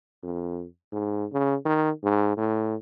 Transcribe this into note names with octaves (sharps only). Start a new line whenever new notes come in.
F2
G#2
C#3
D#3
G#2
A2